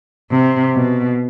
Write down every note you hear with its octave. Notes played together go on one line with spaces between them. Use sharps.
C3
B2